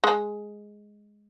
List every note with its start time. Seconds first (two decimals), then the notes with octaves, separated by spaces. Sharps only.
0.04 G#3